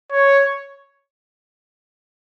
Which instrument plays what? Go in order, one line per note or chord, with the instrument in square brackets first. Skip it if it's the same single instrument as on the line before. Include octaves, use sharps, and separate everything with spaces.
[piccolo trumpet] C#5